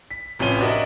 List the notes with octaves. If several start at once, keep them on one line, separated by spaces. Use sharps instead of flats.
B6
A1 C3 F3 C#4 D#7 G7
D4 F#4 A#4 D#5 E5